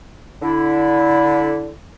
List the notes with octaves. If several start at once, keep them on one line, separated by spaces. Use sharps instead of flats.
D3 E4